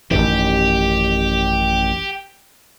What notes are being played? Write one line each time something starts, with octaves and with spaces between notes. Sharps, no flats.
A1 F#2 D#3 G4